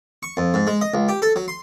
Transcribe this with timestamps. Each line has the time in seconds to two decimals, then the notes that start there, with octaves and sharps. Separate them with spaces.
0.23 C#6
0.37 F2
0.54 G#2
0.67 G#3
0.81 D#5
0.94 C#2
1.09 G4
1.22 A4
1.36 F#3
1.48 C6